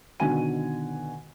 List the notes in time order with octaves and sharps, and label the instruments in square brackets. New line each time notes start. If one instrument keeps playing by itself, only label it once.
[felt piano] B2 D3 D#3 F#4 G#5 D#7